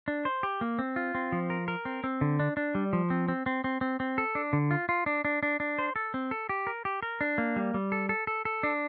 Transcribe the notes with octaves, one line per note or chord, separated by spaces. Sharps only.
D4
C5
G4
A#3
C4
F4
C4
F3
A#4
A#4
C4
C4
D3
D4
D4
G3
F3
C4
C4
C4
C4
C4
C4
A4
D4
D3
F4
F4
D4
D4
D4
D4
C5
A4
C4
A4
G4
A#4
G4
A#4
D4
A#3
G3
G3
A4
A4
A4
A4
D4